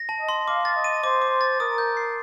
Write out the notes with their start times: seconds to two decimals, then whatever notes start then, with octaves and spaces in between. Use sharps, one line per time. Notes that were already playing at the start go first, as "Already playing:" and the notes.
Already playing: A#6
0.09 A5
0.19 D#5
0.29 C6
0.47 F5 D6
0.65 A6
0.75 D#5
0.84 D#7
1.03 C5 D6
1.22 D6
1.41 A6
1.60 A#4 D#6
1.78 G6
1.97 C7